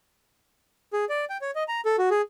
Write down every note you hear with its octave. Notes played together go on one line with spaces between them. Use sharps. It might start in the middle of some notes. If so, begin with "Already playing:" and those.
G#4
D5
G5
C#5
D#5
A#5
A4
F#4
G#4